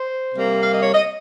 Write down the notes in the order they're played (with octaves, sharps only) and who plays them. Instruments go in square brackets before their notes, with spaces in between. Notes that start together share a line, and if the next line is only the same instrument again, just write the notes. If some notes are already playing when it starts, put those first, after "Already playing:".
Already playing: [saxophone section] C5
C3 G3 A#3
F5
D#5
C#5
D#5